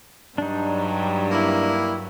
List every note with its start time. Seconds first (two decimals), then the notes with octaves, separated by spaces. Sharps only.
0.38 G2 F#3 G3 D4 D#4
1.31 A#3 E4